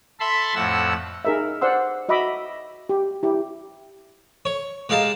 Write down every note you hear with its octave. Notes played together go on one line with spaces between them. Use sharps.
A4 E5 A5 B5 C6
F2 A2 F#5 E6
D#4 G#4 A#4 D#5 E5
C5 D5 F#5 C6 E6
F#4 D#5 E5 B5 D6
G4
E4 G4
C#5
G#3 G4 F5 A5 A#5